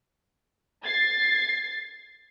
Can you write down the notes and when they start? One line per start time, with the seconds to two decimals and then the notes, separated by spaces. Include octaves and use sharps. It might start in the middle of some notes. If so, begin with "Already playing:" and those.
0.85 G#6 A6 C7